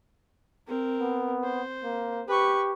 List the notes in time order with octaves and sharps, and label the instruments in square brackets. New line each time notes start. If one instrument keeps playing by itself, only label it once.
[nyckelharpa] C4 A#4
[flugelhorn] B3
[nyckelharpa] C5
[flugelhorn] A#3
[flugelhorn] G4 [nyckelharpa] B4 C#6